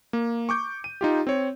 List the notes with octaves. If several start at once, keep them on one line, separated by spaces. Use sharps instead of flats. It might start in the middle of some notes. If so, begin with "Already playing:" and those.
A#3
C#6 D6 G6
D#7
D#4 F4 G4
C4 C#5